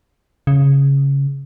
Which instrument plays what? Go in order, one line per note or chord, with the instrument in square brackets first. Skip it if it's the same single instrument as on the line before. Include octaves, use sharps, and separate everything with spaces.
[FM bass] C#3